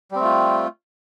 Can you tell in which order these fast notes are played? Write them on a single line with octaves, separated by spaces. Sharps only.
G3 C4 A3 F4